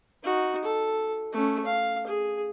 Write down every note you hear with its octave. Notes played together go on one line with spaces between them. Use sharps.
D#4 F#4
A4
A3 C#4
F5
G#4